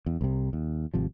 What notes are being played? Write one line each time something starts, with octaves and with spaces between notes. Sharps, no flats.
E2
C2 C3
D#2
G#1 C3 F3